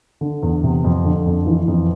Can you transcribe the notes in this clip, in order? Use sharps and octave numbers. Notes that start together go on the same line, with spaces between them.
D3
E2
C3
F2
D3
F2
E3
F2